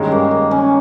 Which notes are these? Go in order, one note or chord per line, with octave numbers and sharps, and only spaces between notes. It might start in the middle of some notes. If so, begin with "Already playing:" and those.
Already playing: G2 D#3 G#3 C#4 D#4 G4
A#3
A#3
C#4